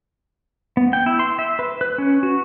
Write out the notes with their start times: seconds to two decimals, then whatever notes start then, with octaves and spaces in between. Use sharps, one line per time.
0.77 B3
0.93 G5
1.06 E4
1.19 C6
1.39 E5
1.59 B4
1.81 B4
1.98 C#4
2.23 F#4